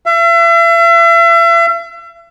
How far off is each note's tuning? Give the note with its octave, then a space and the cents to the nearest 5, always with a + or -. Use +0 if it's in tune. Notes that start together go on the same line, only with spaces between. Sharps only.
E5 +40